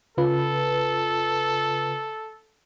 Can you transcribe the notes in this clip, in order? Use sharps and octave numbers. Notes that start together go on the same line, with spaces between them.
C#3 F4 A4 B4